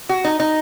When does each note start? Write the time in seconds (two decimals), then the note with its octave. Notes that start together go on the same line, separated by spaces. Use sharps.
0.09 F#4
0.25 D#4
0.40 D#4